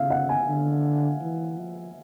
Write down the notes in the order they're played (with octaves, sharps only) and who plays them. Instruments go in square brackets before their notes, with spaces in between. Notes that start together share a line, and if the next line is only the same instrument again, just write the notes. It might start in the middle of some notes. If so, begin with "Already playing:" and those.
Already playing: [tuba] C#3 [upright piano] E5 F5
[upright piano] F#5
G#5
[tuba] D3
E3
F3